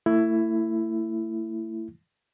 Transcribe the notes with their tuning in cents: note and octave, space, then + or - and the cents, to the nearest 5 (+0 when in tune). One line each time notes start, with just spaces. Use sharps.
A3 +35 E4 +10